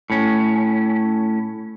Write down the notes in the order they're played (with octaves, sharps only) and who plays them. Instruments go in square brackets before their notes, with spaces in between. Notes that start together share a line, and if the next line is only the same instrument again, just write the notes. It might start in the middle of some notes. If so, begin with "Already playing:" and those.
[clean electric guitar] A2 C#4